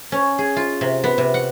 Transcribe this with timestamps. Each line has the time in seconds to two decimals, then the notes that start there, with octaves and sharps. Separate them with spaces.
0.12 C#4
0.39 G#4
0.56 F4
0.81 C3
1.04 B3
1.18 C3
1.34 F#5